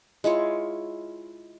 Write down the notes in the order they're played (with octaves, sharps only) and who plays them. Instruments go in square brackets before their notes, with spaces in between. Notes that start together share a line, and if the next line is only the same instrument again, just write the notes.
[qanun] G#3 E4 F4 C#5